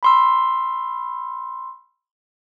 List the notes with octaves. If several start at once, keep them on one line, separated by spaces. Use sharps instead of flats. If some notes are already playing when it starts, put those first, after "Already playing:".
B5 C6 E6